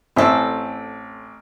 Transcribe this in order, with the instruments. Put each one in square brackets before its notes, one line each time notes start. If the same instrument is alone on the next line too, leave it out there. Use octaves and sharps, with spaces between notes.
[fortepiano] A1 C4 E5 [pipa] C#4 A4